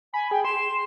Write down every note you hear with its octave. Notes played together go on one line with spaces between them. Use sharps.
G#5 B5
G#4 G5
C6 E7